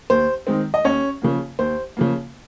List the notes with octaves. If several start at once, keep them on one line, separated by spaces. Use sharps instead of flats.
D#2 C5
D#3 G#3 C4
D#5
D#2 C#4 C#5
C#3 F3 A#3
D#2 C5
C#3 F3 A#3